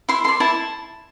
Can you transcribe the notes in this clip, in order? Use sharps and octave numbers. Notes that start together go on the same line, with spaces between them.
E4 C6
A4 D5 C6
E4 A5